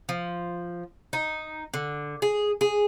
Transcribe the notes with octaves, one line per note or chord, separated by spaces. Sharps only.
F3
D#4
D3
G#4
G#4